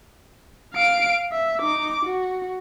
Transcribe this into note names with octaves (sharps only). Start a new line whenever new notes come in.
F5 D7
E5
D#4 D6
F#4